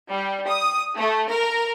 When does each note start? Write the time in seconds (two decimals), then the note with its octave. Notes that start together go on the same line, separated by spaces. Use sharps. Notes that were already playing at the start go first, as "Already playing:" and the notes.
0.12 G3
0.48 D#6
0.97 A3
1.30 A#4